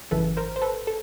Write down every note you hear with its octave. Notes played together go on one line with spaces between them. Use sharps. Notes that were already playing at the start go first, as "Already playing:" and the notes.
G#1 F#2 C#3 E3 A4 B4
A#4 C5
C5
A4 B4
A4